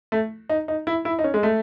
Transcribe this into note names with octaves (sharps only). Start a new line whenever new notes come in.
A3
D#4
D#4
E4
E4
D#4
C#4
G#3
A3